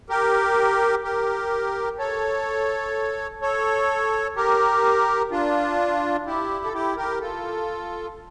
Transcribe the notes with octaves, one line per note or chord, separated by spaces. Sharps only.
G4 A#4
G4 A#4
A4 C#5
A4 C#5
G4 A#4
D4 F4
E4 G4
A4
E4 G4
G4 A#4
F4 A4